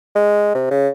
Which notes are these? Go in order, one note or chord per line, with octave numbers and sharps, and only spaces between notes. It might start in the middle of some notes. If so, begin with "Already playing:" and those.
G#3
C3
C#3